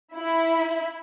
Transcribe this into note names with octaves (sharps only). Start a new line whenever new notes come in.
E4